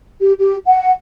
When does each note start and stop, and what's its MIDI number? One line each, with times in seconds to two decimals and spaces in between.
0.21 0.32 67
0.39 0.56 67
0.66 0.90 78